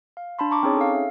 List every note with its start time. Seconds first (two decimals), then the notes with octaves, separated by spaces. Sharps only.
0.17 F5
0.39 D4 A5 B5 C6
0.51 A5 A#5 C#6 D6
0.63 C4 C#4 D#4 G#4 C#5
0.77 A4 F5
0.95 E5